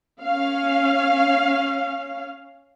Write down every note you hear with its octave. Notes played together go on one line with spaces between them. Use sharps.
C#4 F5